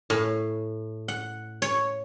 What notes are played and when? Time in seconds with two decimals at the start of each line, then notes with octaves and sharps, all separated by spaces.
0.10 A2
1.08 F#5
1.62 C#5